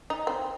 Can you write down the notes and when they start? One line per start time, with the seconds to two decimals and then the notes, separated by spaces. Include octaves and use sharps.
0.10 D#4
0.27 C4